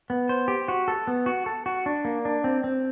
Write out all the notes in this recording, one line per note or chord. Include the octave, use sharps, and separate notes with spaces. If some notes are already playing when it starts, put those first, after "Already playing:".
B3
C5
G4
F#4
A4
B3
F#4
A4
F#4
D4
A#3
D4
C4
C4